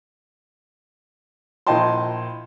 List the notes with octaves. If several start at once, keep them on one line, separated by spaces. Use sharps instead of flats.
A#1 E4 D#5 G5 A5 C6